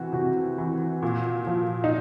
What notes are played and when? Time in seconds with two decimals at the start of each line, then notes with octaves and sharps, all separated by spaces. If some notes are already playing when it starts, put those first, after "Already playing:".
Already playing: C3 E3 F#4
0.12 C3 F#4
0.58 E3
1.02 A#2
1.46 F3
1.84 D#4